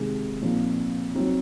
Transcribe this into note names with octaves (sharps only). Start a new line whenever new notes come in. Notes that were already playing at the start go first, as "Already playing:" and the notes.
Already playing: C3 D#3 G#3
A#2 F3 C4 D#4
F#3 C4 D#4